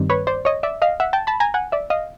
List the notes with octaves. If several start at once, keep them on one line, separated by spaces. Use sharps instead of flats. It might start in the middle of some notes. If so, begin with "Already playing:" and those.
Already playing: G2 D#3 G3 C4
B4 C#5
C5 D5
C#5 D#5
D5 E5
D#5 F5
E5 F#5
G5 A5
A5 B5
G#5 A#5
F#5 G#5
D5 E5
D#5 F5